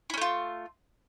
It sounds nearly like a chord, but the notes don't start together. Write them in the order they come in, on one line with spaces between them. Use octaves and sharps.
E4 C#4 A3 F4